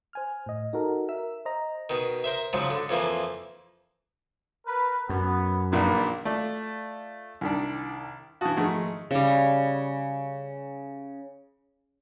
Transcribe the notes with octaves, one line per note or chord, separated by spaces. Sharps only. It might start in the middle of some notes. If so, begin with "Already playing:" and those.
C5 G#5 F6
A2 D#5
D#4 F#4 A4 A#4
A#4 E5 E6
C5 D#5 A#5
B2 D#3
A#4 C5 E5
G#2 C#3 F3 F#3
D3
F2 E3 F3 A#3
A#4 B4
F#2 B3
A#1 A#2 D#3 A#3 D4 B4
A3 F4 D5
C2 D#3 D4
E3 F#4 F5 A5 D#6
G#2 D#3 F3 A3 G#4
C#3 G3